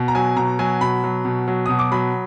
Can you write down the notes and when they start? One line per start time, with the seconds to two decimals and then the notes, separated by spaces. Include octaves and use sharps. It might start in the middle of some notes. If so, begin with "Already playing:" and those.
Already playing: B2
0.08 A#5
0.15 F#3 G#5
0.36 B2 A#5
0.59 F#3 G#5
0.81 B2 B5
1.04 F#3
1.25 B2
1.48 F#3
1.66 B2 D#6
1.79 D6
1.92 F#3 B5